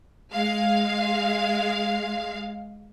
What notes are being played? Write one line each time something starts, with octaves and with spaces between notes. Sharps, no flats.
G#3 F5